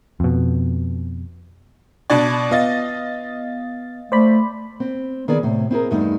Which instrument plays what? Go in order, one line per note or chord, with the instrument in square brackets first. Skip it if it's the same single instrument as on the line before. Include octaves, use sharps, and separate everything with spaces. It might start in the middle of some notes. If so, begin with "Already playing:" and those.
[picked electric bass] F2 B2
[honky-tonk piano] B2 D4 D5 [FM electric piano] A5 B5 G#6
[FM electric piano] B3 A6 [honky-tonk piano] F4 D#5
[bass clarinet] A3 [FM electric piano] C5 D5 B5
[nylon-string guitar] C4
D#3 B3 G#4 B4 D5
A2 C3
C4 E4 G#4 A#4
E2 G2 A3 D#4